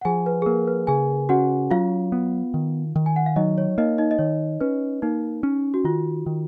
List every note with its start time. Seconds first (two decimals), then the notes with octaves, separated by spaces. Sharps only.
0.01 F#5
0.05 F3 G#4 G#5
0.26 B4
0.42 G#4
0.46 A#3 A#4
0.67 B4
0.87 C#3 G#4 G#5
1.29 C#4 F#4 F#5
1.71 F#3 F4 F5
2.12 B3
2.54 D#3
2.96 D#3
3.06 G#5
3.16 F#5
3.26 F5
3.36 F#3 D#4 D#5
3.58 C#5
3.78 A#3 D#4 D#5
3.98 D#4 D#5
4.11 D#5
4.19 D#3 C#5
4.61 C#4 B4
5.02 A#3 D#4
5.43 C#4
5.74 F#4
5.84 D#3 F4
6.26 D#3